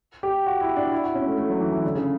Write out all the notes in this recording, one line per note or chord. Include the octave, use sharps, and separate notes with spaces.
G4
F#4
E4
D4
E4
F#4
C#4
A3
A3
F#3
E3
E3
D3
C#3